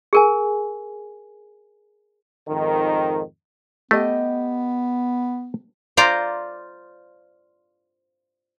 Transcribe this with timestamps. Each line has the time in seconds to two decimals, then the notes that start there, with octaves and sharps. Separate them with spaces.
0.13 G#4 A#4 G#5
2.49 F2 G#2 D#3
3.91 A3 B3 G4 D#5
5.97 F4 C5 D5 A#5